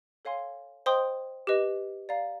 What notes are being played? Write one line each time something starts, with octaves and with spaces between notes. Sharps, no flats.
A4 C#5 F5 G#5 C6
C5 D#5 G5 C6 D#6
G4 B4 D#5
D5 F5 A#5